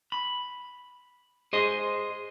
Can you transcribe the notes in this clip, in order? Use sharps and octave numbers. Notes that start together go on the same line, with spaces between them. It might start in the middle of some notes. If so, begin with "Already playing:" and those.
B5
G#4 C5 D#5